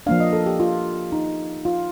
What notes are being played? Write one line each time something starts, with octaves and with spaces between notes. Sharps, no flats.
F3 A#3 D4 F5
D#5
A4
G4
F4
D#4
F4